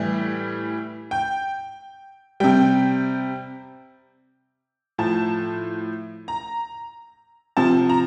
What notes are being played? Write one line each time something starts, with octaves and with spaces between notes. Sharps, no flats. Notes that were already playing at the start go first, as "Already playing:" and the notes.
Already playing: A2 E3 G3
G5
C3 G3 G5
A2 F3 A5
A#5
C3 F3 A5
A#5